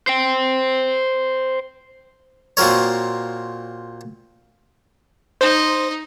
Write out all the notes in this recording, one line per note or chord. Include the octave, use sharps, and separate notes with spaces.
C5 G5
A#2 C4 F#4 A#4 C#5
D#4 C5